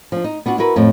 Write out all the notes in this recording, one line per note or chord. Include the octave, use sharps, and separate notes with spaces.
F3 D4
D#4
B3 D4 F4 F#4
E4 F#4 A#4 B4
F2 A2